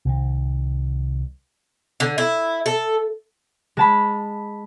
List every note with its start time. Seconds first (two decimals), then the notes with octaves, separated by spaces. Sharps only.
0.05 C2 D#3
2.00 D3
2.18 E4
2.66 A4
3.77 G#3 A5 B5